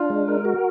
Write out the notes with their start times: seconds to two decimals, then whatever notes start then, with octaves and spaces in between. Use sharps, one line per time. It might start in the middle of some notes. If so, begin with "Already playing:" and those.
Already playing: D4 F4
0.10 G#3
0.28 A#4
0.45 F#4